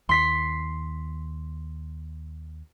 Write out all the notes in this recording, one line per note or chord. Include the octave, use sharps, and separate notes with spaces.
D#2 C6 B6 C7